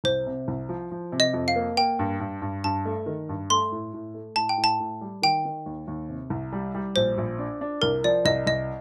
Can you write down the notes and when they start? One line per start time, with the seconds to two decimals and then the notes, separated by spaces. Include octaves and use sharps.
0.04 C2 C5
0.27 C3
0.48 C2
0.69 F3
0.91 F3
1.12 C3
1.20 D#5
1.33 F2
1.48 F5
1.56 A#3
1.77 A#3 G5
1.99 G2
2.20 G2
2.42 G2
2.64 G2 A5
2.85 A3
3.06 D#3
3.29 G2
3.50 A3 C6
3.72 A2
3.94 A2
4.14 A3
4.36 A2 A5
4.49 G5
4.58 A2
4.64 A5
4.80 A2
5.01 G3
5.22 D#3 G5
5.45 D#3
5.66 D#2
5.88 D#2
6.09 C3
6.30 C2
6.52 G3
6.75 G3
6.96 A#1 C5
7.18 A#1
7.38 D4
7.61 D4
7.82 C2 A#4
8.04 F3 D5
8.25 C2 D#5
8.47 C2 D#5